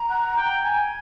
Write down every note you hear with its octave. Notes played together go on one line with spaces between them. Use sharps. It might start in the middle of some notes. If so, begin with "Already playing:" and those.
Already playing: A#5
F#5
G5
G#5